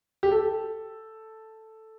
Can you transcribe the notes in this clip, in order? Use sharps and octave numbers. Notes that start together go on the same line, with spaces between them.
G4
A4